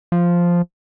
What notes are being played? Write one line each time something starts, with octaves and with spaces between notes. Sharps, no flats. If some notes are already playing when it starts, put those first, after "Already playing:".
F3